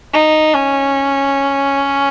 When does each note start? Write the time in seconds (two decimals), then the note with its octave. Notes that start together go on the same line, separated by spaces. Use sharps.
0.13 D#4
0.54 C#4